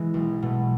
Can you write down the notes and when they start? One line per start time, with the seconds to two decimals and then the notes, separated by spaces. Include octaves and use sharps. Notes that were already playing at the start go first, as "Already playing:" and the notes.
Already playing: E3 G#3
0.14 B1
0.42 B2 A3